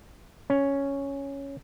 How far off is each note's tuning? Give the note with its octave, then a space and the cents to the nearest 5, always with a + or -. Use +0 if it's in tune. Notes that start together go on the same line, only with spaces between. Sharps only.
C#4 +0